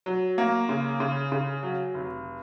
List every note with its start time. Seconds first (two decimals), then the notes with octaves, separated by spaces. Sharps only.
0.06 F#3
0.38 A#3
0.69 C#3
1.00 C#3
1.32 C#3
1.63 F#3
1.94 F1